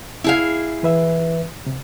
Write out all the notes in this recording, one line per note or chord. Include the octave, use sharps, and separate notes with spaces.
E4 G#4 F5
E3 B4 E5
C3